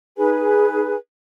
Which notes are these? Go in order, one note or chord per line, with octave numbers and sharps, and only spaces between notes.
D#4 G#4 B4 G#5